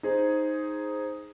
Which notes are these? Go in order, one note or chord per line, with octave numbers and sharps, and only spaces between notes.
D#4 G#4 C5